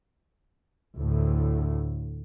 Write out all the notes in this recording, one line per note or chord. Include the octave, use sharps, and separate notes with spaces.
D2 A2